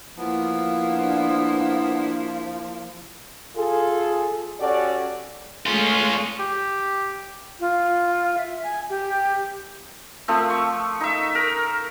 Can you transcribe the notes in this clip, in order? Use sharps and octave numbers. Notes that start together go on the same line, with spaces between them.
F3 A#3 B3 E4
D4
F4 G#4 A4
C#4 F#4 G4 A4 D5
G#3 A3 C#4 F4
G4
F4
E5
G#5
G4
F3 A3 C4
C#6
D#4 E5
A#4